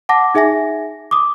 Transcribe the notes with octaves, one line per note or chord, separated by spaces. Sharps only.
F#5 A5 D6 A#6
D#4 G#4 E5 G#5 A#6
D6 D#6